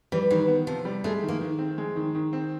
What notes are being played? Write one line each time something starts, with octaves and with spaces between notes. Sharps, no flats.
E3 G3
D#3 E3
B3
C3 F3
G3
G#3 A3
D#3
A#3
D#3
C4
G#3
D#3
D#3
C4